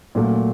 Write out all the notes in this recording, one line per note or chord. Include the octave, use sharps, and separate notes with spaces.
A#2 F#3 A3